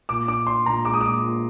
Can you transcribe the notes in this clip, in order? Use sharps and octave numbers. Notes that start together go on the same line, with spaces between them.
A#2 D6
D4 D6
D4 C6
A#2 A#5
G#3 D6
D#6
A#2 D6
A#2